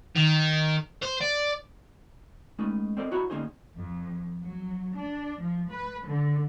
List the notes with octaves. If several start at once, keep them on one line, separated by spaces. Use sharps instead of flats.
D#3
C5
D5
G#3 A3 C#4 D#4 B4 D#5
C4 A4 A#4 C5 D5 D#5
E4 F#4 C#5 E5 A#5 B5
D3 A#3 C#4 D#4 G#4 C5
F2
F#3
D4
F3
B4
D3